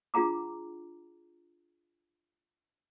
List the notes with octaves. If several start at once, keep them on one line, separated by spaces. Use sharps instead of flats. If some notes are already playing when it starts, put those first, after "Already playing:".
D4 F4 G#4 F#5 A#5 D6